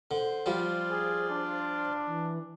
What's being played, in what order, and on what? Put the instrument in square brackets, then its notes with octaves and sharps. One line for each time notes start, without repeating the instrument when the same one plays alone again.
[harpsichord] D3 [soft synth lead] C5
[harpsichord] F3 G3 [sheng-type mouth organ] F4 D5
[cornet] G#4
D4
[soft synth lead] E3